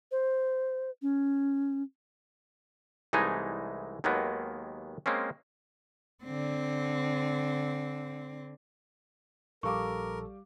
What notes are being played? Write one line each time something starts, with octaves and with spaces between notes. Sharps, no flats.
C5
C#4
C2 E3 G#3 A3 D#4 G#5
D#2 D#3 F#3 G#3 A#3 B3
G#3 A#3 C4 C#4
D3 C4
A#1 G3 A4 A#4 F5 C#6 D6